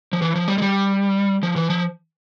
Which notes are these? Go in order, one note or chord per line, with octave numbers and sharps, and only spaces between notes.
F3
E3
F3
G3
G#3
G3
F3
E3
F3